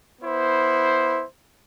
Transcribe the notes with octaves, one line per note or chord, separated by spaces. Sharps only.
B3 E4 C5